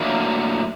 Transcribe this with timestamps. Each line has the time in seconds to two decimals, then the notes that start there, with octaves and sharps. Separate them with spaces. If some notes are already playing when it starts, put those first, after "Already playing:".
Already playing: A2 F#3 A#3 D4